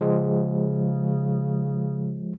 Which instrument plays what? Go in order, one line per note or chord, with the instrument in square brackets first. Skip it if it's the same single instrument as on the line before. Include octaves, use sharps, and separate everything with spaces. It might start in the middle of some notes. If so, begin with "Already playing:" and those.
[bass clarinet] C#3 [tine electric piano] F3 G#3